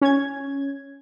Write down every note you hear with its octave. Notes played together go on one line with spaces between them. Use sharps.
C#4 G#6